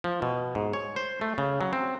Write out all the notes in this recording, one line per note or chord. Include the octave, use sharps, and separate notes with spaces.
F3
B2
G#2
C#5
C5
A3
C#3
F#3
C4